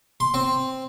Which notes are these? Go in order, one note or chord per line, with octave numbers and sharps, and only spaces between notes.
C6
C4